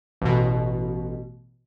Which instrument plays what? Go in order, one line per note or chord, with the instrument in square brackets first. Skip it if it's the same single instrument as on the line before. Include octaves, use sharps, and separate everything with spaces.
[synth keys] A1 B2